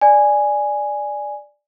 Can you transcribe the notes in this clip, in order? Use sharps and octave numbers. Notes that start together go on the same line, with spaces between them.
D5 G#5